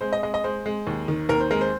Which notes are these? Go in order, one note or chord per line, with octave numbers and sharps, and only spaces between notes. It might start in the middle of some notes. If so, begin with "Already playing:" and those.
G#3 C5
D#5
G#3 D#5
D#5
G#3 C5
G#3
D#2
D#3
D#2 A#4
C5
G#3 A#4
C5